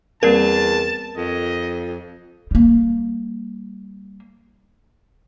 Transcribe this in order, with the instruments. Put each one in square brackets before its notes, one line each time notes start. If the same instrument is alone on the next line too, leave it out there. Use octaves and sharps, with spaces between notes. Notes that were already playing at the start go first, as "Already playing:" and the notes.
[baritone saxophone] E2 [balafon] G3 A#3 C4 [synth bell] A#4 [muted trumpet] A5
[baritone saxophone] F2 [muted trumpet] D#5
[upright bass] G3 A#3